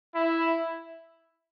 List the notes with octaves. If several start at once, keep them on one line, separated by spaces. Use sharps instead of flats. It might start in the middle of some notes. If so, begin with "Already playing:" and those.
E4